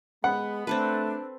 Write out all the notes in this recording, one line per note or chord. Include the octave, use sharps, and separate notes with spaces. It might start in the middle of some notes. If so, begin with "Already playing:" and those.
G#3 B3 F#5 B5
A3 C4 D4 A4 B4